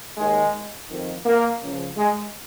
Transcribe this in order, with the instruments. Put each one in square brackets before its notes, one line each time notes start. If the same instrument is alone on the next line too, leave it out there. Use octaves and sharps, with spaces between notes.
[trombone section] D#2 D#3 G#3
F2 D#3
A#3
C#2 C#3 F3
G#3